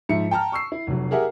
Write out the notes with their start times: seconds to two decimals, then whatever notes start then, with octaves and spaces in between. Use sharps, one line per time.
0.09 G#2 F3 E5 C#7
0.31 G5 A5 A#5 F6
0.52 C#6 E6 C7
0.72 E4
0.87 F1 F#3
1.11 G4 G#4 A#4 E5 F#5